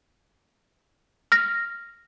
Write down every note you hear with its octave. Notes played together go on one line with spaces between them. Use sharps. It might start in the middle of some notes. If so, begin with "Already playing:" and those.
F6 A#6